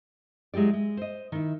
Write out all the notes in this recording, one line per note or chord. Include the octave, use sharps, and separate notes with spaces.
F#3 G#3 E4 G4 D5
G#3
C5 D#5
D#3 E4